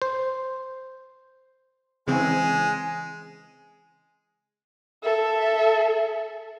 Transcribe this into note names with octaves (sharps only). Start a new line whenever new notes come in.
C5
C#3 E3 G#3 C4 G#5
A4 E5